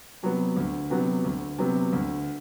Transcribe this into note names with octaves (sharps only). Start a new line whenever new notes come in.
C3 F#3 B3
D2
C3 F#3 B3
D2
C3 F#3 B3
D2